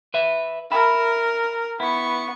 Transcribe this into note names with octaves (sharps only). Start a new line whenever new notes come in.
B4 E5
A#4 E5 B5
B3 E4 C#6